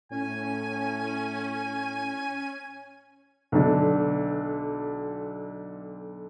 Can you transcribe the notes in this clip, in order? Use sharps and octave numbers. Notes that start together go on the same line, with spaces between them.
A2 C#4 G#5
B1 D3